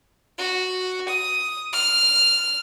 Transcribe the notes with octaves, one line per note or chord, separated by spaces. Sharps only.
F#4
D#6
F6